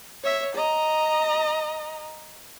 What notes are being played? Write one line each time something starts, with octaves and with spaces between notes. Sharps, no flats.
C#5 E5
D#5 A#5